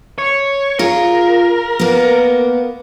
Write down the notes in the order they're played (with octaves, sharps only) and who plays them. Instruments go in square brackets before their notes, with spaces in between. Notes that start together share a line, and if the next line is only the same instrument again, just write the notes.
[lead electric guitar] C#5
[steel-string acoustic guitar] F4 G#4 [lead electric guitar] A#4
[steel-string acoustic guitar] A#3 B3